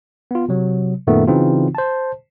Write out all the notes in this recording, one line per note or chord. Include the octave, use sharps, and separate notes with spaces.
B3 F4
C3 F#3
F#2 A#2 D#3 A3 B3
C#3 E3 C4 D#4 F4 F#4
C5 A5